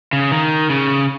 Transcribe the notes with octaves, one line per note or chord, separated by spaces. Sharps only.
C#3
D#3
C#3